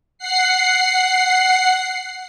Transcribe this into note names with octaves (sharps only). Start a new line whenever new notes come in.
F#5 C7